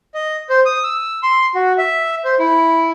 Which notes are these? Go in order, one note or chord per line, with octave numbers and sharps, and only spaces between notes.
D#5
C5
D#6
E6
C6
F#4
E5
C5
E4